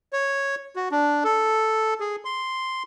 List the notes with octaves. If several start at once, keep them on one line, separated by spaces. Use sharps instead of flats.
C#5
F#4
D4
A4
G#4
C6